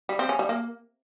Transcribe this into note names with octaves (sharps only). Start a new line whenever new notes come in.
G3
C4
C#4
G3
A#3